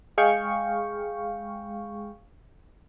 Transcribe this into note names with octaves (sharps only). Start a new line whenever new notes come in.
G#3 G#4 F5 G5 C#6